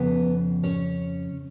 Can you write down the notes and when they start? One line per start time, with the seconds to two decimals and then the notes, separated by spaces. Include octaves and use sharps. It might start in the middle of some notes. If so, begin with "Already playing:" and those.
Already playing: F2 C#3 F3 B3 B4
0.63 C#4 C#5